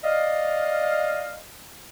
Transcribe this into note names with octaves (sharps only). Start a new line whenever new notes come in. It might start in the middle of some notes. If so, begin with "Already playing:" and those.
D5 D#5 F5